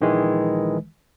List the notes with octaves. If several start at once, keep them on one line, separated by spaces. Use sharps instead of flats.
A#1 D#3 E3 G#3